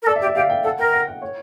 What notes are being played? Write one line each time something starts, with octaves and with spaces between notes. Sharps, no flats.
A#4
A4 D5
E5
G4
E5
G4 F5
G5
A4 F#5
A#4 G5
F#5
F#5
C#5